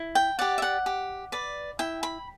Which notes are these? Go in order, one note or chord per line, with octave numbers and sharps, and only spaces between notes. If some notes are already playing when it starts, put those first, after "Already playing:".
Already playing: E4
G5
G4 D5 F#5
E5
F#5
G4
B4 D5
E4 G5
B5